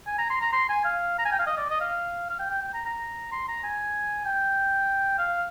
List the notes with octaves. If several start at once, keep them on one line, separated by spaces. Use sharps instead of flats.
G#5
A#5
C6
A#5
C6
G#5
F5
A#5
G#5
G5
F5
D#5
D5
D#5
F5
F5
G5
G5
G5
A#5
A#5
C6
A#5
G#5
G5
F5